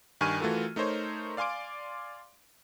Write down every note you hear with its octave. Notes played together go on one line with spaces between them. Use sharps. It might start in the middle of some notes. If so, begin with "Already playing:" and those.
G2 D#3 G#5 C#6 F6 D#7
E3 A3 F4 F#4 A4 A#4
A3 D#4 A#4 C5 C#5
D5 F5 G#5 C6 D6 D7